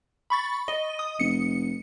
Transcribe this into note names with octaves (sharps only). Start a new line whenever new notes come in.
B5 C#6 A6
D#5
D#6
F1 C#7